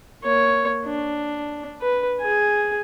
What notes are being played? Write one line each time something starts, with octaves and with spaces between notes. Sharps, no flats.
A#3 C#5
D4
B4
G#4 G#5